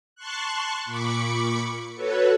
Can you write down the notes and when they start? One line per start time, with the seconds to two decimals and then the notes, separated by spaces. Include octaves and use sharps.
0.15 A5 C6 C#6 F#6
0.85 A#2 B5 C#6 D6 C#7
1.95 F#4 A4 B4 C#5